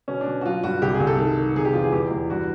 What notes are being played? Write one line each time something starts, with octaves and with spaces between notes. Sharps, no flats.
B2 C#4
D4
B2
F#4
F#3 F4
G2 F#4
C2 G4
G#4
C2
A4
D#3
D#3
C3 G#4
G4
E2 F4
G#4
E2 G4
E2
G2 F#4